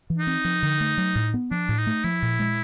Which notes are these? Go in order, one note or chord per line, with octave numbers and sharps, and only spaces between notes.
E3
D#4
C4
F3
D3
A3
F#3
A2
B3
F3 D4
A2
D#4
A3
F3 E4
A#2
G#3